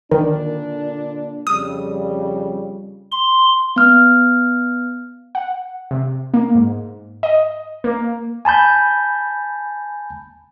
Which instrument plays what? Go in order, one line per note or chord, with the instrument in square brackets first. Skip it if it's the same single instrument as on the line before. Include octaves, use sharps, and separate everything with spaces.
[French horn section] A#2 D3 D4 [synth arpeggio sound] D#3
[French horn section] F2 C#3 G3 [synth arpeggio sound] D#6
[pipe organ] C6
[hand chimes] B3 F6
[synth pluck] F#5
C3
A#3
G#2
D#5
A#3
[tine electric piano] G#5 A5 B5 G6